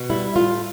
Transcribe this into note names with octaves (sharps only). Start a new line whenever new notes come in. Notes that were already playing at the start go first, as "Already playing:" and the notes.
Already playing: B2
G3 E4
A2 F4